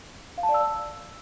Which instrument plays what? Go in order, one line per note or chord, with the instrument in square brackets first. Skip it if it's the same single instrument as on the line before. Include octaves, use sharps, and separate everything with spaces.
[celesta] F5
A5
D5
E6